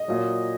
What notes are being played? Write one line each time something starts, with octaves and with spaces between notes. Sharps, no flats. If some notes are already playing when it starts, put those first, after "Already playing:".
Already playing: D#5
A#2 F#3